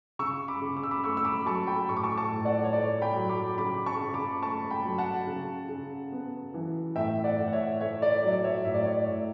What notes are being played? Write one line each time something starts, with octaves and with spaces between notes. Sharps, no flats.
C#3 C#6 E6
B5 D6
C#3
D6
E6
B5 D6
A3 C#6 E6
E6
B5 D6
F#3 A5 C#6
G5 B5
A2 C#6
D6
A5 C#6
A5 C#6
A2
D5 F#5
C#5
A3 D5
G5 B5
F#3
B5 D6
C#3 B5 D6
A5 C#6
C#3
B5 D6
A3 A5 C#6
G5 B5
F#3
F#5 A5
C#3
C#3
B3
E3
A2 E5 G5
D5 F#5
A2
F#5
C#5 E5
A3 C#5 E5
D5
F#3 D5
C#5 E5
A2 E5
D5
C#5
D5
A2